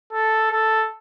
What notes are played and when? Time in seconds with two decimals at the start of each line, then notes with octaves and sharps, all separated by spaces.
0.12 A4
0.51 A4